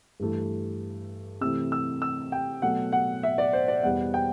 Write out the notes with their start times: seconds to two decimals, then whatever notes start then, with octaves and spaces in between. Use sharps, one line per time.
0.20 G2 E3 A3
1.41 C3 E3 A3 E6
1.72 E6
2.02 E6
2.32 G5
2.62 B2 F#3 A3 F#5
2.93 F#5
3.23 E5
3.38 D5
3.53 C5
3.68 D5
3.83 E2 B2 G3 F#5
4.14 G5